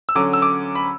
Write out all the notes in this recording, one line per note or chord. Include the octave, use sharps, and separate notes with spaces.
E6
D3 F#3 C#4 D6
E6
D6
B5